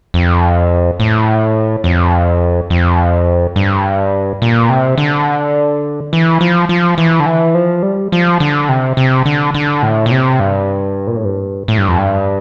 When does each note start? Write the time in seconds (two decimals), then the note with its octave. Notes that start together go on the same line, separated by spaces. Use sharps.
0.14 F2
1.00 A2
1.84 F2
2.70 F2
3.56 G2
4.42 A#2
4.69 C3
4.98 D3
6.13 E3
6.41 F3
6.69 F3
6.98 E3
7.20 D3
7.26 E3
7.54 F3
7.83 G3
8.12 F3
8.40 D3
8.69 C3
8.97 C3
9.25 D3
9.54 D3
9.83 A2
10.06 A#2
10.11 C3
10.40 G2
11.07 A#2
11.16 A2
11.25 G2
11.68 A2
11.78 G2
11.88 F2
11.98 G2